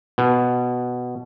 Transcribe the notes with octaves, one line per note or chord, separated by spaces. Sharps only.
B2